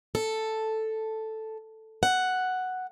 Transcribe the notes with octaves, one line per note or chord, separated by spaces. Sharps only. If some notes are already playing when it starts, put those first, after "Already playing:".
A4
F#5